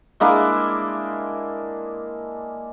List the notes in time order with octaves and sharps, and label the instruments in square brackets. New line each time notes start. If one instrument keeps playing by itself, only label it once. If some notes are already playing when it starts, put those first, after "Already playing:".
[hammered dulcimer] G#3 A#3 D4 E4